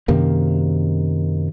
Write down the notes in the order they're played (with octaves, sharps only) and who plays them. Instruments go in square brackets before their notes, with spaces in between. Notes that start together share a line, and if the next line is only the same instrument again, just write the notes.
[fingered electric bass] F#2 C3 D#3 A#3